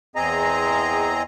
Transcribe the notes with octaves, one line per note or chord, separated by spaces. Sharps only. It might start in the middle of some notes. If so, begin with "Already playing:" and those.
E2 C4 G#4 D#5 A#5